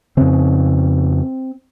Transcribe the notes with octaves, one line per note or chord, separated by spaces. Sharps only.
F2 C#3 C4